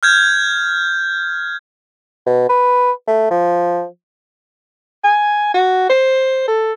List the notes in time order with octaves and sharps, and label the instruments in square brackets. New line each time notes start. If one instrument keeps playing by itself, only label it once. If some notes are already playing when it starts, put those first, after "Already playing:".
[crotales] F6 G6 G#6
[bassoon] B2
B4
A3
F3
[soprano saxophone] G#5
F#4
C5
A4